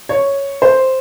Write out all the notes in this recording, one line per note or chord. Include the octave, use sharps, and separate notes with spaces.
C#5
C5